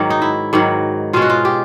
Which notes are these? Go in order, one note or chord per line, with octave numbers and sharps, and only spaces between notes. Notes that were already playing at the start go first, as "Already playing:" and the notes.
Already playing: G#2 D#3 F#3
D#4
E4
G#2 D#3 F#3
B2 G#3 C#4 F4
F#4
F4
G4